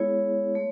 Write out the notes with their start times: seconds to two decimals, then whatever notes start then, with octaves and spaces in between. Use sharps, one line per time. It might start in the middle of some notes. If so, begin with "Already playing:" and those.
Already playing: G#3 B3 E4 G#4 C#5
0.55 A3